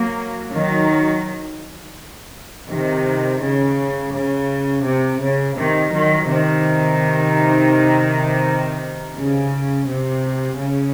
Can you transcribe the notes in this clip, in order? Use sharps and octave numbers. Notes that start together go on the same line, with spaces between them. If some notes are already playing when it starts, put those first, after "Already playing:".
Already playing: F#3 A#3
D#3 F#3
C3 D#3
C#3
C#3
C3
C#3
C3 D#3
D#3 F#3
C3 D#3
C#3
C3
C#3